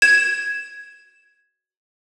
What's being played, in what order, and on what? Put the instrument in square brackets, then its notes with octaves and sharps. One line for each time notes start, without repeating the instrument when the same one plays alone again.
[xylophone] G#6 E7